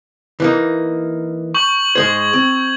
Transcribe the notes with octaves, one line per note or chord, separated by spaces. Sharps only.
E3 A#3 D#4
C#6 G6 F#7
G#2 G#3 C5 G#6 G7
C4